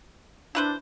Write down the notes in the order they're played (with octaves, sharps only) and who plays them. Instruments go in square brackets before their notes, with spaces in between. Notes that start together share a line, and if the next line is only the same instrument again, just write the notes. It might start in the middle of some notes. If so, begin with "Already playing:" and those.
[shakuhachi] D4 [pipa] E4 B4 C5